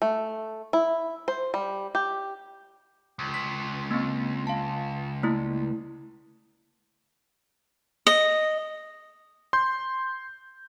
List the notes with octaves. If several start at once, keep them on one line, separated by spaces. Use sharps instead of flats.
A3
E4
C5
G3
G4
C#2
B6
A#3 C4
F5 A5
A3 A#3 E4
D#5
C6 G6